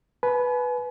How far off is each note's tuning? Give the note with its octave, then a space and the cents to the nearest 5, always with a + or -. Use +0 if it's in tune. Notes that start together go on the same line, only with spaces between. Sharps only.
B4 +0 G#5 +40